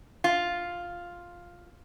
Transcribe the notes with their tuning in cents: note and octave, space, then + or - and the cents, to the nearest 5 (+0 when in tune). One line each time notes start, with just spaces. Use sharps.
F4 +5